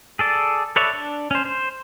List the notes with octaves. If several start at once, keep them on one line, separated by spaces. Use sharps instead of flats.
G#4 A4 D5
A4 B4 C#5 D5 E5
D4
C#4 C5
C5